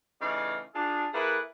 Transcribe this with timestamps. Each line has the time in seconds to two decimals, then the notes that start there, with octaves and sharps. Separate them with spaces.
0.20 C#3 E3 A3 D#4 D5 F5
0.74 D4 F4 G#4
1.13 A#3 E4 G#4 A4 B4